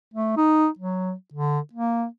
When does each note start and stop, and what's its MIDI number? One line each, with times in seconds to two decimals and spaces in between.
0.14 0.36 57
0.37 0.68 63
0.79 1.13 54
1.33 1.59 50
1.73 2.05 58